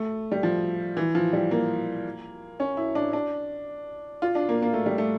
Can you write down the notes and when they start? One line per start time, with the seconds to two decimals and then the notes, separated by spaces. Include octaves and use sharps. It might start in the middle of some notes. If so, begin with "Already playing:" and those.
Already playing: A3
0.32 G3
0.43 F3
0.97 E3
1.15 F3
1.33 G3
1.51 A#3
2.60 C#4
2.77 E4
2.95 D4
3.13 D4
4.22 F4
4.35 D4
4.49 A#3
4.62 A#3
4.74 A3
4.86 G3
4.98 A3